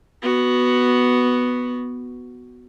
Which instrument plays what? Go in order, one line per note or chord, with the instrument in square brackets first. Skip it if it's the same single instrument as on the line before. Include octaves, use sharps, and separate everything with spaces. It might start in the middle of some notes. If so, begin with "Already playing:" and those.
[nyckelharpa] B3 F#4